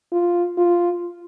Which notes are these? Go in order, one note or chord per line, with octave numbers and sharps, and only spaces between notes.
F4
F4